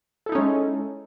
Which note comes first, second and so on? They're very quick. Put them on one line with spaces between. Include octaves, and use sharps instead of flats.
A4 E4 D#4 C#4 G#3